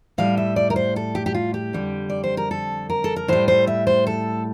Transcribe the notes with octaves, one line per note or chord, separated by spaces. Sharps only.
A2 G3 F5
E5
D5
A#4
C5
A4
G4
G4
F4
G4
F2 D3 G3
D5
C5
A#4
A4
A#4
A4
A#4
A2 G3 C5
C5
E5
C5
A4